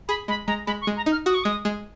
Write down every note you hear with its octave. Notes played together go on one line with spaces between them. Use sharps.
G#4 B5
G#3 B5
G#3 A#5
G#3 B5
C#6
G#3
A#5
D#4
F6
F#4 D#6
C#6
G#3 D#6
G#3